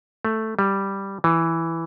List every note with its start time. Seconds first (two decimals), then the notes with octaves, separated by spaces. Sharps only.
0.25 A3
0.59 G3
1.24 E3